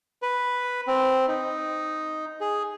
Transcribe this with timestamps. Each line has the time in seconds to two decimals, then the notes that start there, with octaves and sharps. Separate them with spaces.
0.22 B4
0.87 C4
1.28 D#4
2.41 G#4